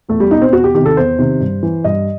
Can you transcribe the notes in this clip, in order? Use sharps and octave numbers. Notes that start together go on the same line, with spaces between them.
E2 A3
G3
B2 D#4
C4
E2 F#4
G4
C3 D#3 G4
A4
E2 C5
C3 D#3
G2
E3
G2 D#5